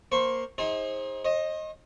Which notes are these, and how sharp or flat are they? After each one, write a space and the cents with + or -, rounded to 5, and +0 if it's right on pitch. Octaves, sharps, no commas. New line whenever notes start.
A#3 +0 C5 +0 C#6 -20
D#4 +35 G#4 -25 C5 +30
C5 +45 D#5 +0